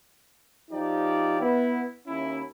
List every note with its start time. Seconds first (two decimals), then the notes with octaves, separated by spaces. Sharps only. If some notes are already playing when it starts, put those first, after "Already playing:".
0.71 F3 D#4 G4 D5
1.40 B3 E4
2.06 D#2 C#4 E4